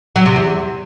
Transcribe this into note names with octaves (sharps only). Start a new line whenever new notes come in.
F#3
C3
E2